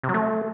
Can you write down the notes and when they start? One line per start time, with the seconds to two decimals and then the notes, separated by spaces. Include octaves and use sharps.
0.03 C3
0.09 F#3
0.14 A3